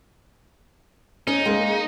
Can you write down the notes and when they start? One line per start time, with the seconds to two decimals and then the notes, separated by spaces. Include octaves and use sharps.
1.27 C#4 D#4
1.45 G#3 A#3